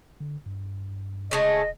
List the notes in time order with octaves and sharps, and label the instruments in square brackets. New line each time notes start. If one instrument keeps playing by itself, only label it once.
[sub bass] D3
G2
[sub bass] D#1 [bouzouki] C#3 G#3 A3 [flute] D#5